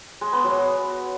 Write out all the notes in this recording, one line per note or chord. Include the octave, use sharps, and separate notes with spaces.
G#3
B3
F#3